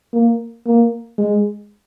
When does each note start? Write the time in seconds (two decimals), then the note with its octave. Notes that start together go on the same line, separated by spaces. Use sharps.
0.13 A#3
0.66 A#3
1.18 G#3